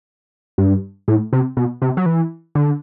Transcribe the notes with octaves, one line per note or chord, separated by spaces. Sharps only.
G2
A2
C3
B2
C3
F#3
E3
D3